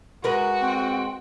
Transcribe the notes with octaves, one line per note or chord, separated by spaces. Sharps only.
G#3 F#4 A#4 B4
C4 G5